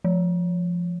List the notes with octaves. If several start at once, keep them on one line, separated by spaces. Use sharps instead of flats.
F3